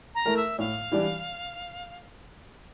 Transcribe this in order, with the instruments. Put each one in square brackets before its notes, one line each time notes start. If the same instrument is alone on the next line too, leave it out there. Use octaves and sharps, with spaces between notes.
[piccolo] A#5
[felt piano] A3 E4 A#4
[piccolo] E5
[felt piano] A2 [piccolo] F5
[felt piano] E3 G3 D4